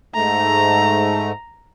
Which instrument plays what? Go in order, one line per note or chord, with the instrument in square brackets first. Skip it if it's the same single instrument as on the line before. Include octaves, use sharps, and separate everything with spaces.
[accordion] G#2 A3 [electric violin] A#5